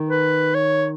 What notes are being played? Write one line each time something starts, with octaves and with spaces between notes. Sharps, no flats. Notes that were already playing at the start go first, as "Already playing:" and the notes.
Already playing: D#3
B4
C#5